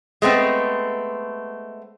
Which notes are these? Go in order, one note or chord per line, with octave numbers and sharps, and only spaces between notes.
G#3 A3 B3 C4